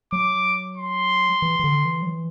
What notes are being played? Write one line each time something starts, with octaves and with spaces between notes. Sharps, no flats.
F#3 D6
C6
E3
E3
D3
E3
F#3
E3